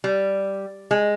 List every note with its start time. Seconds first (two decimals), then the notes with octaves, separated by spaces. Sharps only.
0.04 G3
0.91 G#3